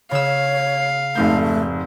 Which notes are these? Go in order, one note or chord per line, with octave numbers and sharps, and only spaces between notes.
C#3 C#5 F5 E6
F1 G#2 A3 G6